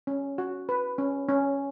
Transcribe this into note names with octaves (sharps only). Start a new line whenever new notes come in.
C#4
F#4
B4
C#4
C#4